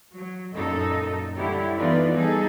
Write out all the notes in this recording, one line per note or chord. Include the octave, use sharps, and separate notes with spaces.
F#3
F#2 A#2 D#4 A4 D#5
D3 G3 E4 G4 C#5
E3 B3 D#4 F4 D5
G3 D#4 G#4 A4